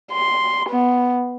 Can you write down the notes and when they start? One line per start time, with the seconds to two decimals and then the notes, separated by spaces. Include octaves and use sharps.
0.12 C6
0.69 B3